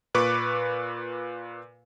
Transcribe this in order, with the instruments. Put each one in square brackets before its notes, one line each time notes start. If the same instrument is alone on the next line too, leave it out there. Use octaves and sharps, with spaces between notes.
[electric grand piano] A#2 B4 C#6 D6